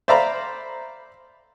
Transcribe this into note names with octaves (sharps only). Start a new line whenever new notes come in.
C5 D5 E5 F5 A#5 B5